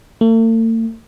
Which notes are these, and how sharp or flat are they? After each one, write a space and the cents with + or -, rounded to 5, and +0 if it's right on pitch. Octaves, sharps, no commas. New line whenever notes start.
A3 +45